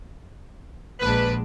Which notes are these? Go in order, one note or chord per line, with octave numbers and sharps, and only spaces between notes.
A#1 G#3 D4 B4